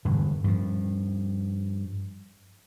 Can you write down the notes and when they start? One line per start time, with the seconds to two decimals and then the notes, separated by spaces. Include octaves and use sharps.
0.05 E1 G2 D3
0.44 G2 F3